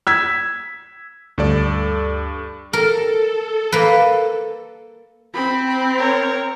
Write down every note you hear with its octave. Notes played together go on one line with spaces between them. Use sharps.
E6 G#6 B6
D2 G2 A4 D5
A4 A#4
A#3 B4
C4 B5
B5
A#4 C#5